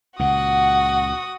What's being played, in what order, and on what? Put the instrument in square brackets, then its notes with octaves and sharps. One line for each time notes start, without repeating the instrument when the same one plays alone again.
[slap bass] C#2 A#2 [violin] F#4 D#6 [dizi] F#5